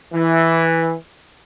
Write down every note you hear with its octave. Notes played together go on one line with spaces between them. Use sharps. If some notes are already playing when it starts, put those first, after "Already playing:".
E3